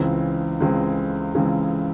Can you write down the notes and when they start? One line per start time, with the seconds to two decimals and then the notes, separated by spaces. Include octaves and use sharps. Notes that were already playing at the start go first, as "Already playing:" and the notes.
Already playing: C#2 C#3 E3 G#3 C4
0.60 C#2 C#3 E3 G#3 C4
1.35 C#2 C#3 E3 G#3 C4